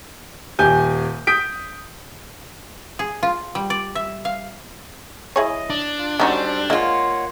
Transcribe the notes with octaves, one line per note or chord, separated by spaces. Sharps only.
D#1 G4 G#5 G6
D#6 G6 B6 D7
G#4
F4
G3
D5
E5
F5
E4 G#4 C#5 D#5
D4
F4
G3 C#4 D#4 F#4 A4 C5
G#3 A#3 F4 C#5 F#5